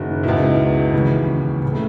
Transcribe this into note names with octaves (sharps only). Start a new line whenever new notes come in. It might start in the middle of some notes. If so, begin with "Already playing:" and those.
Already playing: F#1 D#3 F#4
C#2 B2 E4
D#4
E4
D#2 C#3 E3 C#4
C#3 E3
A3